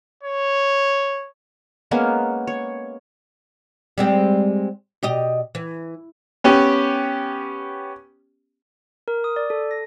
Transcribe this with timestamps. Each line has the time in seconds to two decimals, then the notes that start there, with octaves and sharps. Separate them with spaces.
0.23 C#5
1.91 G#3 A#3 B3 C#4
2.47 C#5
3.98 G3 G#3 C4
5.03 B2 G4 D#5
5.55 E3
6.44 B3 C#4 G4
9.08 A#4
9.24 D#6
9.36 D5
9.50 A4
9.71 A#6